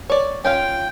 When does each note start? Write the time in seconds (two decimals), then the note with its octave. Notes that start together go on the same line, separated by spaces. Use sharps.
0.10 C#5 D5
0.45 C#4 F4 F5 G5